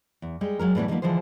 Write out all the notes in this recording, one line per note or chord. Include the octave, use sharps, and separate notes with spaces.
E2
G3 G#3 G4
F#3 G#3 A#4
A2 E3 G3 B3 D4 C#5
D3 D#3 F3 G3 A#3 B3
D3 E3 F3 G#3 G#4 C5